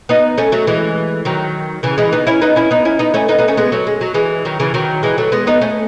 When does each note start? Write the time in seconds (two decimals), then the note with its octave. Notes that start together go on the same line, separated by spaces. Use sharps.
0.09 B3 D#4
0.38 A3 C#4
0.52 F#3 A3
0.67 E3 G#3
1.25 D#3 F#3
1.83 C#3 E3
1.98 E3 G#3
2.13 B3 D#4
2.27 C#4 E4
2.42 B3 D#4
2.56 C#4 E4
2.71 B3 D#4
2.85 C#4 E4
2.99 B3 D#4
3.14 A3 C#4
3.28 B3 D#4
3.38 B3 D#4
3.48 A3 C#4
3.57 G#3 B3
3.72 F#3 A3
3.87 G#3
4.01 F#3
4.14 E3 G#3
4.45 D#3 F#3
4.60 C#3 E3
4.74 D#3 F#3
5.03 E3 G#3
5.18 F#3 A3
5.32 G#3 B3
5.47 B3 D#4
5.61 A3 C#4